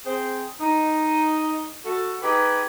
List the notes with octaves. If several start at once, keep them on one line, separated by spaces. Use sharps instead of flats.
C4 G#4 C5
D#4
F#4 A4
D#4 G4 G#4 B4